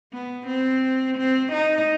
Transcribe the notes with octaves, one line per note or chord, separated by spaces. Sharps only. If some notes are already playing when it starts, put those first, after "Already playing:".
B3
C4
C4
D#4